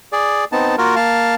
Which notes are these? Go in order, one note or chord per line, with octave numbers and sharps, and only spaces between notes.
G#4 D5
B3 C4 D#4 A5
A#3 F4 F#4 A#4
A#3 F5 A5